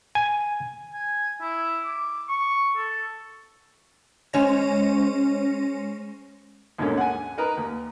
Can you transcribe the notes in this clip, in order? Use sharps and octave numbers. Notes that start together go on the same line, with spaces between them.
G#5
G#5
E4
D6
C#6
A4
G#3 C#4 C5 C#5 A#6
D#2 G#2 B2 D3 A#3 C#4
F#5 G#5
D#4 A#4 B4 A#5
D#2